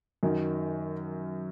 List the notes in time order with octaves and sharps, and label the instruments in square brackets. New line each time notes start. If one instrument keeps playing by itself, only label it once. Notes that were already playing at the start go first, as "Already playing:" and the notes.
[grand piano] F#2 D#3 F#3